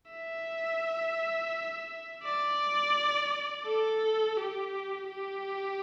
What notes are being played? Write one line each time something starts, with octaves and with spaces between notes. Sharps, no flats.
E5
D5
A4
G4
G4